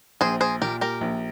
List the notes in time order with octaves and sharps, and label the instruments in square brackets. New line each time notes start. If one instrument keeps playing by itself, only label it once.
[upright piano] A#1 [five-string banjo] G#4 C5
[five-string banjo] G#4 C5
[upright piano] A#2 [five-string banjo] G4 A#4
[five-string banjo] G4 A#4
[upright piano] A#1